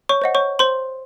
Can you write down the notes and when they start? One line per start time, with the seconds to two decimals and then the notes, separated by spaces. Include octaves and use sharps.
0.09 C#5 C#6
0.22 C5 D#5 F#5
0.35 C#5 C#6
0.59 C5 C6